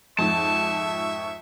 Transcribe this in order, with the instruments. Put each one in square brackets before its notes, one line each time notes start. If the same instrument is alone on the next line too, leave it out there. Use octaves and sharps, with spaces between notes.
[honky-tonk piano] F2 G#2 [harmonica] E5 C#6 [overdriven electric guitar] A5